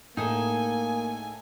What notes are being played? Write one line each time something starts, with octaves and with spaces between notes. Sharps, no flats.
A2 A#3 D#4 G#4 A4 G#5